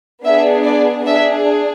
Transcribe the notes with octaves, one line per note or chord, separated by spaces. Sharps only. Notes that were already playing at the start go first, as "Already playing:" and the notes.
B3 D4 G#4 E5
D5
D4 G#4 E5